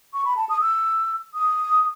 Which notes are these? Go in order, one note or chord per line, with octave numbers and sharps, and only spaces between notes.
C#6
B5
A5
D#6
E6
D#6